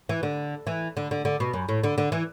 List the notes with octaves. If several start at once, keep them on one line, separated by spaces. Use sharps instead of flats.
E3
D3
E3
D3
D3
D3
B2
F#2
A2
D3
D3
E3